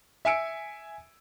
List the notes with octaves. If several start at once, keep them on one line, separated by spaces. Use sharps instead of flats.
E5 G#5 E6 C#7 D7